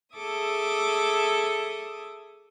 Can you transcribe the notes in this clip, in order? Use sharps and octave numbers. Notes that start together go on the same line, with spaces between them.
G#4 A4 E5 D6 D#6